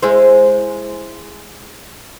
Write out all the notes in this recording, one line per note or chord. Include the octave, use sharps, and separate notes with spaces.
G#3 E4 C5